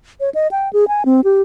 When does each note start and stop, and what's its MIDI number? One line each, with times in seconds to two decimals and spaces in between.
0.20 0.30 73
0.34 0.48 75
0.51 0.71 79
0.73 0.88 68
0.88 1.03 80
1.05 1.21 60
1.24 1.42 67